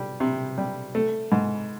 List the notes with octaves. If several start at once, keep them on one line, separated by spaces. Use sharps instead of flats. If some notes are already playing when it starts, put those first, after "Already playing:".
Already playing: G3
C3
G3
A3
G#2